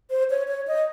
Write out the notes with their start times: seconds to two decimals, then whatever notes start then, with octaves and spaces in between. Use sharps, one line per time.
0.10 C5
0.30 C#5
0.48 C#5
0.68 D#5